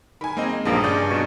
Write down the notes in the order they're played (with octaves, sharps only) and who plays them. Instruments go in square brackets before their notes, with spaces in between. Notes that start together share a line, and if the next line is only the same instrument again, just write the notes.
[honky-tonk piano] D#3 G#5 [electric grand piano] B5
[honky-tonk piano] G#3 [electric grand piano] A#3 C4 D#5
[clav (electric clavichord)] A#1 F3 A#3 [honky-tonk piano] G2 [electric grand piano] G3 G#4 [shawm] D#5
[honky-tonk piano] G2 C#3 G6 [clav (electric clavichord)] D5
[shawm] G#5
[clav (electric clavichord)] B2 [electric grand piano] D#4 C#6